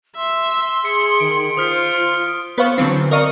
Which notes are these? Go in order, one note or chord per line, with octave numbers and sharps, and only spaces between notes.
E5 C6
G#4 B6 C#7
D#3 D7
F4 C5 D#6 F6 B6
C6
B3 B4 C5 F5 C#6
D3 E3 F#3 C4
A#4 D5 D#5 F5 C#6 D#6